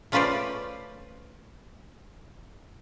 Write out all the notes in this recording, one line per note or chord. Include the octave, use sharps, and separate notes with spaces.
A3 C#4 F4 B4 C5 D5